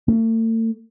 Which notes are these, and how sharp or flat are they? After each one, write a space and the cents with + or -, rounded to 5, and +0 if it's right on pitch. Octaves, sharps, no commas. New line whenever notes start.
A3 +40